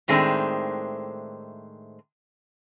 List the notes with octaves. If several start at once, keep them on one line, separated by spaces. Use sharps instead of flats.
A2 D#3 G#3 A3 C4 D4